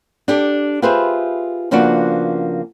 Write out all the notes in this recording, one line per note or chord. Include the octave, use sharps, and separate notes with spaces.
D4 G4 A4
F4 G4 G#4 B4 C5 E5
C#3 F3 A#3 B3 D4 F#4